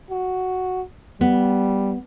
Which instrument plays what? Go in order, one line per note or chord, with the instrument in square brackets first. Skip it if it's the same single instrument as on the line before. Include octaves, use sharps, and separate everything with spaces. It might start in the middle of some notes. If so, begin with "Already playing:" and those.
[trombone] F#4
[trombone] G3 [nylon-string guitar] B3